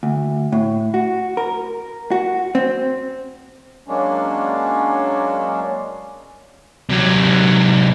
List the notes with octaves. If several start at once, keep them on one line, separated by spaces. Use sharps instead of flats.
D2
A2
F#4
A#4
F#4
C4
F#3 G#3 A#3 C#4 D4
C3 F#3